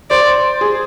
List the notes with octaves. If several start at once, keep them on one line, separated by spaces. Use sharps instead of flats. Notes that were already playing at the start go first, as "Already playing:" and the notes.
C5 D5
G#4